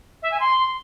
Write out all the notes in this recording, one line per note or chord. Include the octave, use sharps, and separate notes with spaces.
E5
G#5
C6